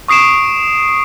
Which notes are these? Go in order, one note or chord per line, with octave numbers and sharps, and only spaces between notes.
C#6 D#6 C7 D7 E7